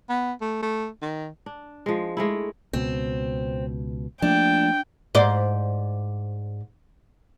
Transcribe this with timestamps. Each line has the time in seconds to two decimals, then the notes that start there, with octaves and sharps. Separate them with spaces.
0.09 B3
0.41 A3
0.63 A3
1.02 D#3
1.46 D4
1.86 F3 G#3
2.17 G#3 A3 E4
2.73 C#2 B2 C4
4.22 F3 A3 A#3 D4 G5
5.15 G#2 C5 D5